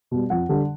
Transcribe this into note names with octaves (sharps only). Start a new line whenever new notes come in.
B2 G3
F2 F#5
D3 G3